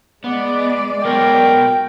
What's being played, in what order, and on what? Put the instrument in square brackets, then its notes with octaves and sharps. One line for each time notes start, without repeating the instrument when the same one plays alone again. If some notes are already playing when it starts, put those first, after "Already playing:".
[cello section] G#3 D5 [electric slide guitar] B3
[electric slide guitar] F#3 B3 C#5 [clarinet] A#4 [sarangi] G5